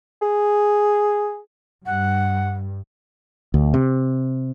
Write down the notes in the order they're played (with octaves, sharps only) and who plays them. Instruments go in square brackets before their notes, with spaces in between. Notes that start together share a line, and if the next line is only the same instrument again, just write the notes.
[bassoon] G#4
[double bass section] G2 [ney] F#5
[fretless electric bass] D2
C3